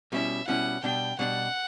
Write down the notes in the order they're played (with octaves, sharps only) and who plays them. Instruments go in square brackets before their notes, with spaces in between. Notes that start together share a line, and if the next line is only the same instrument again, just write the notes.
[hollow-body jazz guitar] B2 G3 C#4 E4 [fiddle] E5
[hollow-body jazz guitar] B2 G3 C#4 E4 [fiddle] F#5
[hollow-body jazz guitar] B2 G3 D4 [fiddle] G5
[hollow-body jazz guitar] B2 G3 D4 [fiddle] F#5